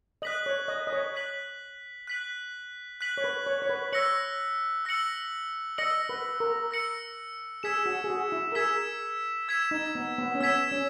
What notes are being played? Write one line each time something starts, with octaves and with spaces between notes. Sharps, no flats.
D#5 F#6 B6 F#7
C#5
D#5
D#5
C#5
F#6 B6 F#7
F#6 B6 F#7
F#6 B6 F#7
C#5
B4
C#5
C#5
B4
C#5 E6 A#6 C#7 F#7
E6 A#6 C#7 F#7
D#5 E6 A#6 C#7 F#7
B4
A#4
E6 A#6 C#7 F#7
G#4 E6 G#6 B6 E7
F#4
G#4
F#4
E4
A#4
G#4 E6 G#6 B6 E7
E6 G#6 B6 E7
D#4
B3
B3
C#4
B3 E6 G#6 B6 E7
C#4